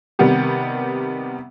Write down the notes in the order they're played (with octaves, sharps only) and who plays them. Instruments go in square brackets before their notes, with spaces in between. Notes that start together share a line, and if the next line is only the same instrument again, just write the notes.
[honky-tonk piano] C3 D#3 G3 B3 G4